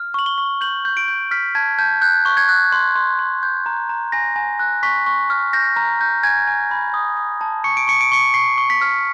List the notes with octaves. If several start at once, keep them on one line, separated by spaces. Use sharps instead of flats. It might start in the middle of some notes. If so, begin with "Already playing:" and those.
Already playing: F6
C#6 F#7
G7
C#6
G6 F#7
G6
D7
G6
F6 B6
A5 G#6
A5 G6
F#6 G6
C#6
G#6
F#6
C6
C6
C6
G6
A#5
A#5
G#5 A#6
G#5
F#6
C#6 B6
C#6
F6
G6 A#6
A#5
G6
G#5 G#6
G#5
B5
D#6
D#6
A5
C#6 C#7
D7
C#6 C#7
D7
C#6 C#7
C#6 C7
C#6
B6
F6